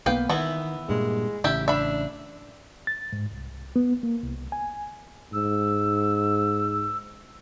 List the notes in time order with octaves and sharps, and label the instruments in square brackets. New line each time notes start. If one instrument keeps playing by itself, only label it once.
[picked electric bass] B1 A#3 B3 [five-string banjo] B4 F5 G5
[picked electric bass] D#3 [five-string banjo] E3 B3 E4
[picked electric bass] G2 A#2 [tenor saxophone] G#3
[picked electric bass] A1 C#3 [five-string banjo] E4 G4 E5
[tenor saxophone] D4 [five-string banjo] E5 B5
[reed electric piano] A6
G#2
C2
B3
A#3
C2
G#5
[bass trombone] G#2 [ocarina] E6